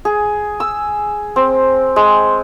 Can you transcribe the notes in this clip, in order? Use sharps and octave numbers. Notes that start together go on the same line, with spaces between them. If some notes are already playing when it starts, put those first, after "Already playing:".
G#4
E6
C4
G#3